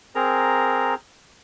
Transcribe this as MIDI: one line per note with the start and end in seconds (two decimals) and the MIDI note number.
0.15 0.94 60
0.15 0.94 68
0.15 0.94 70
0.15 0.94 82